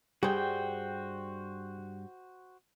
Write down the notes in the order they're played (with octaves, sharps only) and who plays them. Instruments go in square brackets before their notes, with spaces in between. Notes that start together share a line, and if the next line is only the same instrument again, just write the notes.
[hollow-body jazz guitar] G2 G#4 [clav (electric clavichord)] G3 [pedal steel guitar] F#4 C5 G5